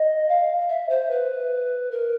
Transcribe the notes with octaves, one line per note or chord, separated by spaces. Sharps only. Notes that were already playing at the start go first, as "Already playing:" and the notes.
Already playing: D#5
F5
E5
C5
B4
A#4